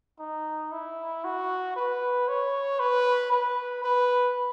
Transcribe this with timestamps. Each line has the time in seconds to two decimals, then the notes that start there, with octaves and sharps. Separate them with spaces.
0.19 D#4
0.72 E4
1.24 F#4
1.76 B4
2.28 C#5
2.80 B4
3.32 B4
3.84 B4